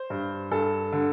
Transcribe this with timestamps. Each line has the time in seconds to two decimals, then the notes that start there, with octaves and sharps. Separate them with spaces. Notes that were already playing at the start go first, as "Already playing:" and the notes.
Already playing: C5
0.10 G2
0.51 G2 A4
0.92 D3